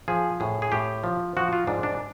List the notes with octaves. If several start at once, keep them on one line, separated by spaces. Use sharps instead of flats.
F3 G#4
A2 G#4
G#4
A2 G4
F3
F3 F#4
F4
G#2 D4
D4